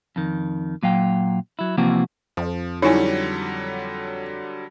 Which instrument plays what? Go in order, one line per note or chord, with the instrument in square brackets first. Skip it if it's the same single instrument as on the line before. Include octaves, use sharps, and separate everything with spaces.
[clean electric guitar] F2 D#3
A#2 F#3 F5 G5
F#3 E4
C3 E3 F3 A#3 C4 F#4
[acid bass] F2 [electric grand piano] F3
[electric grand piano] D3 F#3 G3 [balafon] D#4 E4 G#5 [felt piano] C#5